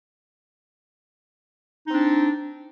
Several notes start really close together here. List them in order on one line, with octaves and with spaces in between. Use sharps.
D#4 C4 D4